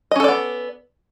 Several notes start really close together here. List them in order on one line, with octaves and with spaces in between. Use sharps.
D#5 C#4 A4 D5 B3